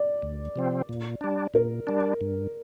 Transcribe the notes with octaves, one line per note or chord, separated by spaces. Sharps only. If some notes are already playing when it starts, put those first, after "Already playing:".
Already playing: D5
D2
C3 F3 C4
A#2
G3 D4
A#2 A#4
G3 D4
G2